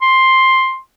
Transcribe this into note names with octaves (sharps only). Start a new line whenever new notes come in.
C6